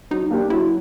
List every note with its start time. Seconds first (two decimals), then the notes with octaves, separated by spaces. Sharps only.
0.11 F#3 D#4
0.31 A#3 D4 G4
0.50 F#3 E4